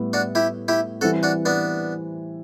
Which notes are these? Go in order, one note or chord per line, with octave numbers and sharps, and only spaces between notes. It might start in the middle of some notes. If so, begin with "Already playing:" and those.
Already playing: A2 G3 B3
D4 F#4
E4 G4
E4 G4
E3 G3 C4 F#4 A4
D4 F#4
B3 D4